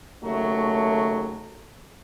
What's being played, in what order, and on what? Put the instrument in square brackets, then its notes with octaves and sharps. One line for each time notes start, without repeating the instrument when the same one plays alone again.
[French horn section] D#2 C#3 F#3 A3